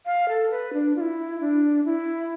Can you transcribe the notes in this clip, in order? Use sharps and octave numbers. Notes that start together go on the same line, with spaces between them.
F5
A4
B4
D4
F4
E4
D4
E4